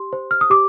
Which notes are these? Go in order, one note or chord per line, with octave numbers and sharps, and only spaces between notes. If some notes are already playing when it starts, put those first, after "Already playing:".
Already playing: G4 C6
C5
F6
D#6
G4 D6